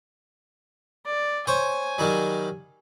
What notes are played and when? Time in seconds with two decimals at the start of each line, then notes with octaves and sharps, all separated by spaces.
1.05 D5
1.47 C5 C#5 G#5
1.98 D#3 F#3 G3